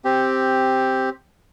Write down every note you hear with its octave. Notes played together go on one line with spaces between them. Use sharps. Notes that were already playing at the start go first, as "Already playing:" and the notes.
C4 G4